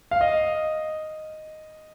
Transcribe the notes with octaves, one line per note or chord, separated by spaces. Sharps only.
F5
D#5